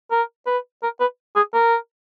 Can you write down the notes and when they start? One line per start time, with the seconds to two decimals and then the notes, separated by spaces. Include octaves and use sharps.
0.11 A#4
0.47 B4
0.83 A#4
1.00 B4
1.36 G#4
1.54 A#4